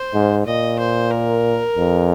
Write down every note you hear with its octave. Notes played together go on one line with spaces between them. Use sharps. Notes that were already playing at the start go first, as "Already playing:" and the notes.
Already playing: C5
G#2
A#2 D#5
C5
A#4
F2